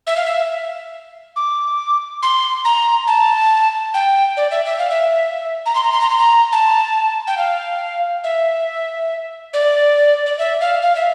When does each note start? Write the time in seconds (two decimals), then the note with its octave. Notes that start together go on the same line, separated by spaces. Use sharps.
0.07 E5
0.17 F5
0.26 E5
1.36 D6
2.23 C6
2.65 A#5
3.07 A5
3.94 G5
4.37 D5
4.51 E5
4.65 E5
4.78 F5
4.90 E5
5.66 A#5
5.75 C6
5.84 A#5
5.92 C6
6.01 A#5
6.10 C6
6.18 A#5
6.52 A5
7.27 G5
7.38 F5
8.24 E5
9.53 D5
10.26 D5
10.39 E5
10.61 F5
10.82 F5
10.95 E5